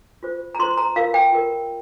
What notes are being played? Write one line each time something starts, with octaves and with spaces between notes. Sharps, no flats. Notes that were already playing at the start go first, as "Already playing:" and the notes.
F4 C5
A#5
F4 C5 C6
A#5
F4 A#4 F5
G5
F4 A#4